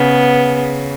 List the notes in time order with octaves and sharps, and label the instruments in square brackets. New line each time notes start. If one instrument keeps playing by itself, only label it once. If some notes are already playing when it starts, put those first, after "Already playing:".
Already playing: [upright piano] C#3 [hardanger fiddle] B3